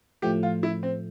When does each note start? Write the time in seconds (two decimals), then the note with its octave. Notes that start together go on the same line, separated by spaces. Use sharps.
0.22 A2 F3 A3 G4
0.43 F4
0.63 E4
0.83 C4